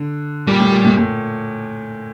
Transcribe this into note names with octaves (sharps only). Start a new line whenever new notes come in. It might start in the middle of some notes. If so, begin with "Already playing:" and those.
Already playing: D3
A#2 G3
A2
A#2
A2
A2